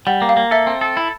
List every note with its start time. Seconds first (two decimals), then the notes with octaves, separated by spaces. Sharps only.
0.07 G3 F#5
0.22 A#3
0.29 F5
0.37 A#3
0.51 A4 E5
0.67 C4
0.81 A4
0.97 E4